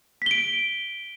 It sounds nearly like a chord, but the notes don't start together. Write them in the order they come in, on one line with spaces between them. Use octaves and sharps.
B6 G7 D7